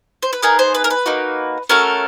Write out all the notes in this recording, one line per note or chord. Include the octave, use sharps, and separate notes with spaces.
C5
B4
B3 D#4 G#4 A#4
C5
B4
A#4
B4
A#3 D#4 F#4
A3 C#4 F#4 A4 A#4